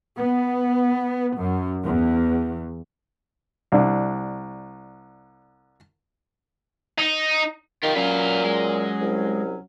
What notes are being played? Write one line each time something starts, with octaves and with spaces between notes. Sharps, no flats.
B3
F#2
E2
C2 D4
D#4
D#3 F4 G4
A#2 F#3 C#4 B4 F5
G#3
C2